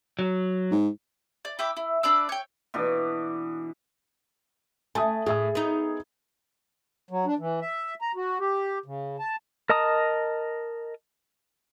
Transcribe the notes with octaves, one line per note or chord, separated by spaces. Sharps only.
F#3
G#2
D5
E4 G5 B5 D6
E4
D4 B4 D5 E6
C#5 G5
B2 E3 D4
A3 G#5 A5 D#6
A2 G#4 E5 D#6
B3 D#4
F#3
D4
E3
E5
A#5
F#4
G4
C#3
A5
A#4 D#5 A5 A#5 D#6